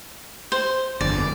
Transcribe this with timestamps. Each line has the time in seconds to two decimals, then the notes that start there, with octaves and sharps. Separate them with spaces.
0.52 C5
1.01 G1 F2 D5